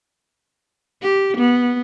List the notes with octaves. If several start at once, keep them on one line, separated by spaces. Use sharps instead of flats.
G4
B3